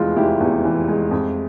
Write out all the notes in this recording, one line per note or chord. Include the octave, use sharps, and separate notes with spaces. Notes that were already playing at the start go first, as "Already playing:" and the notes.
Already playing: F1 E2 E3 G#3 F4
F1 E4 G4
E2
E3
G#3
F2